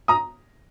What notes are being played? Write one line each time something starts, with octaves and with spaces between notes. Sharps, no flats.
A#5 D#6